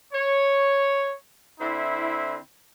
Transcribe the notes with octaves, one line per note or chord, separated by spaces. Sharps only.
C#5
D3 C4 E4